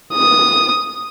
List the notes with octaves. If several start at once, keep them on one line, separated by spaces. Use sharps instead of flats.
D#6